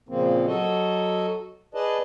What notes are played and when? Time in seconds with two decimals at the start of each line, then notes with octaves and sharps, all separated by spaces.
0.09 A#2 C#3 F3 A#3 C4
0.47 F#3 F#4 A4 D#5
1.74 G#4 B4 D5 D#5 A5